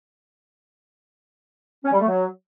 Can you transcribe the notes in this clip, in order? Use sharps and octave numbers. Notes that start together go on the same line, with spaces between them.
C#4
G3
A3
F#3